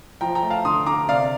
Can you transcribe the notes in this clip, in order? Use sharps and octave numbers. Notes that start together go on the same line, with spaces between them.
F3 G5 A#5
G5 A#5
A3
F5 A5
D3 C6 D#6
D3 A#5 D6
C3 D5 F5